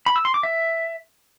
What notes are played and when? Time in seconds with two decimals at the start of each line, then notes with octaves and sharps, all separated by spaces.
0.06 B5
0.16 E6
0.25 C6
0.34 D6
0.43 E5